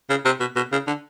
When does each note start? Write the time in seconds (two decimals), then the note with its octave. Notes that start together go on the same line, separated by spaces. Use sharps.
0.10 C#3
0.25 C3
0.40 B2
0.56 B2
0.72 C#3
0.87 D3